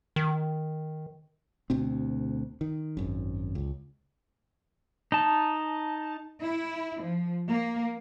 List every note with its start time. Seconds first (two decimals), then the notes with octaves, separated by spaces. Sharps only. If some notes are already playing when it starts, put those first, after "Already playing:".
0.16 D#3
1.70 D2 B2 C4
2.61 D#3
2.97 G#1 F#2
3.55 C#2
5.12 D#4 A5
6.40 E4
7.00 F3
7.48 A#3